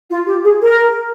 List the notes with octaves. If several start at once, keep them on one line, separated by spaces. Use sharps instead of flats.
F4
G4
G#4
A#4